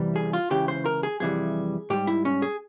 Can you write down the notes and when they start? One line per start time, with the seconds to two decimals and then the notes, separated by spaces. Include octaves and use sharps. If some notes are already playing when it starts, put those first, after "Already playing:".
Already playing: E2 C3 E3 G3
0.16 G#4
0.33 F4
0.51 C#2 C#3 E3 G4
0.68 C5
0.86 A#4
1.03 G#4
1.20 F2 C3 E3 G3 G#4
1.90 G#2 G3 G4
2.07 E4
2.25 C#4
2.42 G#4